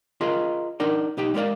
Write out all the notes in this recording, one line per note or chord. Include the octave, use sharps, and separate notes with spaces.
F4 G#4 A#4 D#5 F5
D4 D#4 A#4 D5
B1 D#4 G4 G5
G3 G#3 A#4 D5 F5